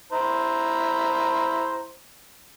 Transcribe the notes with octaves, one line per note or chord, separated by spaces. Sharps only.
E4 C5 A#5